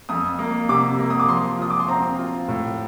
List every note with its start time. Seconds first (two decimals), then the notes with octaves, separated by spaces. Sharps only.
0.09 F2 D#6
0.39 A#3
0.69 C3 D6
0.99 A#3
1.10 D#6
1.20 D6
1.28 F3 C6
1.59 F4 D#6
1.70 D6
1.80 C6
1.88 C4 A#5
2.19 F4
2.48 A2